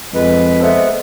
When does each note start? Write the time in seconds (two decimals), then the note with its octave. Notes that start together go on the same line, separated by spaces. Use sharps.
0.14 F2 G#3 B4
0.61 B3 A4 C5 E5